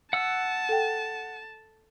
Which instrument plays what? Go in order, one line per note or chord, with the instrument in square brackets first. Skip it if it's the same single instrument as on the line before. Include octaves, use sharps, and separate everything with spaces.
[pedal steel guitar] F#5 E6 [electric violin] A5
[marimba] A4 G5